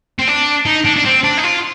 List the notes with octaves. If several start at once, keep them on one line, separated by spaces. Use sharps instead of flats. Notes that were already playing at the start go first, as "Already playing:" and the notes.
C4
D4
D#4
D4
D4
C4
D4
D#4
F4